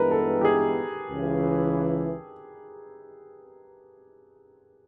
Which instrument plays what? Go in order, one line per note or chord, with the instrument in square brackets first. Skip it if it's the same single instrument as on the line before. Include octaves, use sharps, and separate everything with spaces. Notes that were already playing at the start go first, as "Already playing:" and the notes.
Already playing: [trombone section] G2 E3 G#3 B3 [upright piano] A#4 B4
[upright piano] A4
G4
G#4
[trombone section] C#2 C#3 E3